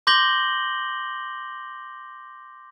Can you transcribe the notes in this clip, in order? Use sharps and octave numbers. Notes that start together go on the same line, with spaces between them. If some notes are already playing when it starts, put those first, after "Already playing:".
C6 D6 G6 A#6 F#7 G7